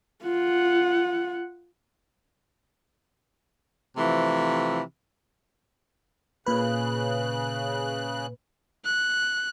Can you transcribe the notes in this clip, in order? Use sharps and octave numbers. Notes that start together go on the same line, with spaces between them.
F4 F#5
C3 E3 F3 A3
A#2 C#3 B4 F#6
F#6